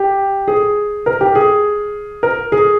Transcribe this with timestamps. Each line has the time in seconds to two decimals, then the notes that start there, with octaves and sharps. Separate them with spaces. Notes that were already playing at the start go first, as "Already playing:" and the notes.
Already playing: G4
0.48 G#4
1.06 A#4
1.21 G4
1.35 G#4
2.23 A#4
2.52 G#4